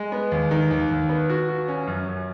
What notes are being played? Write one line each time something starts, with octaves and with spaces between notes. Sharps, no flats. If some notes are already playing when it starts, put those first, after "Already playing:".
Already playing: G#3
B3
D#2
D#3
D#2
D#2
B3
F#4
F#4
C#4
F#2
F#2